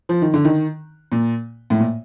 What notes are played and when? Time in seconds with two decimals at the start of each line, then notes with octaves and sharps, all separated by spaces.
0.09 F3
0.22 D#3
0.34 D3
0.45 D#3
1.12 A#2
1.70 A2
1.79 A#2